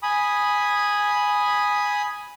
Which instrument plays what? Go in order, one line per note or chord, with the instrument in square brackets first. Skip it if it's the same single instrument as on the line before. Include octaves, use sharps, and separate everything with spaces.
[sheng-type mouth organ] G#5 B5 D#6